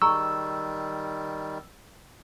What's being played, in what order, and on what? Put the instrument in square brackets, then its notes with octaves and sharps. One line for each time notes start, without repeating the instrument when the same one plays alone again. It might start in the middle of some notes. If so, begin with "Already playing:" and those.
[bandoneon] D#3 G3 [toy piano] G#4 A#5 C#6 [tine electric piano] E6